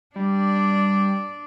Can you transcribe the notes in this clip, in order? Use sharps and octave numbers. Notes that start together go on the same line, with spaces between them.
G3 D4 D5